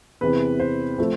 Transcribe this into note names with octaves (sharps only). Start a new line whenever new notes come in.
E2 C3 E3 B4
C5
F3 A3 C4